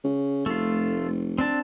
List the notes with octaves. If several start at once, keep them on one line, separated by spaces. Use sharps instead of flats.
C#3
F1 A3 F4
C4 D4 A5